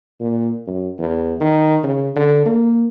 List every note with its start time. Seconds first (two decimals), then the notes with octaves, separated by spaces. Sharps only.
0.20 A#2
0.68 F#2
0.99 E2
1.41 D#3
1.84 C#3
2.16 D3
2.46 A#3